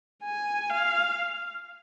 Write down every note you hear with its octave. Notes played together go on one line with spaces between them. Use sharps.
G#5
F5